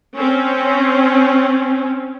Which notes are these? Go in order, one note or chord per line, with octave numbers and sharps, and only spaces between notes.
C4 C#4